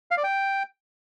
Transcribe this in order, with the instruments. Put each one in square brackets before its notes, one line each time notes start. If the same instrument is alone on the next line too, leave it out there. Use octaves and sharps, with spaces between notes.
[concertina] F5
D5
G5